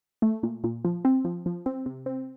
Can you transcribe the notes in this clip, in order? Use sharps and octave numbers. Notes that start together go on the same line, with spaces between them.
A3
A#2
A#2
F3
C4
F3
F3
C4
C3
C4